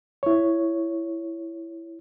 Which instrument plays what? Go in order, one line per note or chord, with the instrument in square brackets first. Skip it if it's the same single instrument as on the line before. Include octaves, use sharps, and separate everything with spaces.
[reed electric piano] E4 C#5